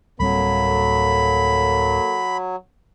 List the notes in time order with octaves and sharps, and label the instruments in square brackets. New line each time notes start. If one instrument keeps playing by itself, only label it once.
[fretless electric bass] D1 G3 C4 [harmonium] F#3 [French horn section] A#3 A4 [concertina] B5